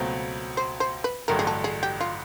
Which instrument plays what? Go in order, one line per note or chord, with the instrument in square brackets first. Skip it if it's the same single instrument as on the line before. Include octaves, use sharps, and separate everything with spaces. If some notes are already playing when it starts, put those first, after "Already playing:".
Already playing: [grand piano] C#2 B2 F#3 A3 C4
[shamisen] C5
C5
B4
[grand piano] A1 G2 D3 F#3 A3 [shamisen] A#4
[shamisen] G#4
A4
G#4
G4
F4